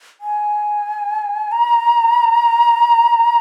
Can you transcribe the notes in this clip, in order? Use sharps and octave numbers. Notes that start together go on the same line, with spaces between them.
G#5
A#5